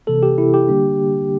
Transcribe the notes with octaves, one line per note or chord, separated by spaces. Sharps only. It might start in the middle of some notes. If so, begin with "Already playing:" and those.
C3 E3 A#3 A4
G4
E4
G4
D3 G3 A#3 D4